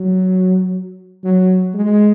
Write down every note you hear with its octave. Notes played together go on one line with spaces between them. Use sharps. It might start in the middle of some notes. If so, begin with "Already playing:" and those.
Already playing: F#3
F#3
G#3